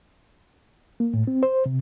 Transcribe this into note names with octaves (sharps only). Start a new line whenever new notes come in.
A#3
A2
C4
C5
C3